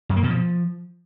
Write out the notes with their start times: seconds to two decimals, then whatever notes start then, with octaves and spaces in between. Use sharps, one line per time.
0.09 F#2
0.16 A#3
0.23 B2
0.30 F3